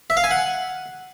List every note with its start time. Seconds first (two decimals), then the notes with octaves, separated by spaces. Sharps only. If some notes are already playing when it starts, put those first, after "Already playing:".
0.10 E5
0.17 F5
0.24 G#5
0.31 F#5